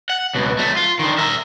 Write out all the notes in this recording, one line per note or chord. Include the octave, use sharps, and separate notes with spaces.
F#5
C#2 B2
F#3 A3
F4
D3 D#3
A#4 E5